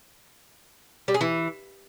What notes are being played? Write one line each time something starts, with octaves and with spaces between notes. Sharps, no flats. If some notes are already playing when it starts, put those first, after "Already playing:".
G3
G#4
E3